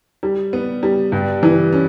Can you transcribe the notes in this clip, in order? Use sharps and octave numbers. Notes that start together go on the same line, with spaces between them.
G3
B3
G3
G2
E3
C#4